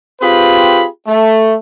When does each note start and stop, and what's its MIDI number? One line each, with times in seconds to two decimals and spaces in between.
0.21 0.85 60
0.21 0.85 65
0.21 0.85 67
0.21 0.85 68
0.21 0.85 71
0.21 0.85 83
1.07 1.56 57